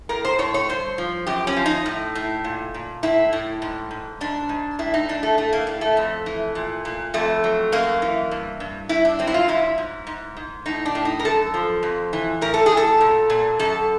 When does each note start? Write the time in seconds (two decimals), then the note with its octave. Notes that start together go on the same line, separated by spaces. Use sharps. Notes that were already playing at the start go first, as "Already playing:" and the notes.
0.09 A2 A#4
0.25 C5
0.39 A2 C#5
0.54 C#5
0.69 G2 C5
0.98 F3
1.27 F#2 G4
1.47 C#4
1.56 F3
1.66 D#4
1.86 A2
2.15 A2
2.44 A#2
2.74 A#2
3.03 A2 E4
3.33 A2
3.62 G#2
3.91 G#2
4.21 G#2 D4
4.49 G#2
4.79 A2 E4
4.94 D#4
5.08 A2 D4
5.23 A3
5.38 A2 A3
5.53 A#3
5.67 A2
5.81 A3
5.97 F2
6.26 E3
6.55 A#2
6.85 A#2
7.14 F2 A3
7.44 F#3
7.72 F#2 A#3
8.02 E3
8.31 G2
8.60 G2
8.89 G2 E4
9.05 D4
9.19 F#3 C4
9.27 E4
9.34 F4
9.48 G#2 E4
9.78 G#2
10.07 G#2
10.37 G#2
10.66 A2 D#4
10.85 D4
10.95 A2
11.05 D#4
11.19 A#4
11.25 F#2 A4
11.54 F3
11.83 F2
12.13 E3
12.41 A2 A#4
12.54 A4
12.66 G#4
12.71 A2
12.77 A4
13.01 A#2
13.30 A#2
13.59 F#2 A4